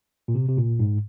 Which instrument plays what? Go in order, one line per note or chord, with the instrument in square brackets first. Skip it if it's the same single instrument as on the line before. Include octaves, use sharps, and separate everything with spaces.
[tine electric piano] A#2
C3
C3
A#2
G#2